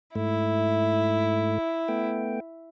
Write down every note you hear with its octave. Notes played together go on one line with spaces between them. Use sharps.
G#2 A3 E4
A3 B3 G5